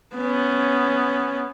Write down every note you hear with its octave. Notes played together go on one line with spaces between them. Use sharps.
B3 C#4